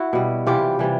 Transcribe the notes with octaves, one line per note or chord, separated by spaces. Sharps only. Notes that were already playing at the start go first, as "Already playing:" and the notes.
Already playing: E4 F#4
B2 G3
C3 E3 G3 F4 G4
C3 E3 G3